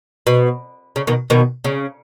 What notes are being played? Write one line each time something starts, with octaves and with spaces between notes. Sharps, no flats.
B2
C#3
B2 D#3
B2 D#3
C#3